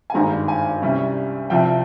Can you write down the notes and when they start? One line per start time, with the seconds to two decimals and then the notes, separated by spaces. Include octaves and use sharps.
0.10 G#5
0.14 G#1 G2 D#3 G#3 A#5
0.48 G#5
0.82 C2 C3 G3 C#4
1.50 C2 C3 F3 G5